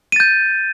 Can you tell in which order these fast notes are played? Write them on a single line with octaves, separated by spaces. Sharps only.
D#7 A6 G6